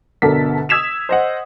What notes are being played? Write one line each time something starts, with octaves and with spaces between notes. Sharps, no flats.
G1 B2 D3 A4 A#4 B6
D#6 E6 G#6 B6 E7 F7
C5 D#5 F#5